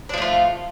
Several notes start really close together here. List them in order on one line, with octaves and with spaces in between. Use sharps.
D4 F3 A3 F4